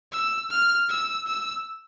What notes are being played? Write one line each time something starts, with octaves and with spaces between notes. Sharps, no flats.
E6
F6
E6
E6